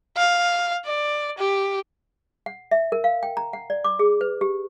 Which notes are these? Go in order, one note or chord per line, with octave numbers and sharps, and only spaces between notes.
F5
D5
G4
F#5
E5
A#4
F5
G5
A#5
F#5
D5
D6
G#4
B4
G4